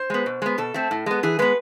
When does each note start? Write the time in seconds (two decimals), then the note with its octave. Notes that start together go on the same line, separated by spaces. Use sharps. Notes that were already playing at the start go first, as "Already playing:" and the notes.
Already playing: C5
0.10 G#3 B3
0.26 B2
0.42 G#3 B3
0.58 B2 A4
0.74 A3 C4
0.91 A2
1.06 G#3 B3
1.23 E3 G#4
1.39 G#3 B3 B4